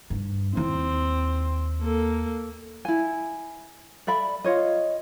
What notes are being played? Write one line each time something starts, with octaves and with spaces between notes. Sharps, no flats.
G2
D#2 C4 E4
A#3 A4
E4 G#5
A4 D5 E5 B5
F4 C#5 D#5